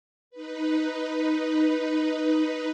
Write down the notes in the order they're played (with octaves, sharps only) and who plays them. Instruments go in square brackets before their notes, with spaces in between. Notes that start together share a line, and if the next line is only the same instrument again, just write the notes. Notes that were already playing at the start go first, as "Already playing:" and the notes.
[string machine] D#4 B4